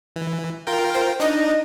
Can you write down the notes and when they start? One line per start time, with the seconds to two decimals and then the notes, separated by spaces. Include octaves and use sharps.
0.16 E3
0.67 F4 A#4 G5
0.94 C5
1.20 D4 D#4 D#5